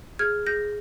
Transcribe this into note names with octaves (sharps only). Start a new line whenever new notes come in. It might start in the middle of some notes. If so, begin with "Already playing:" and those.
G#4 F6 G#6
G#4 G6 A#6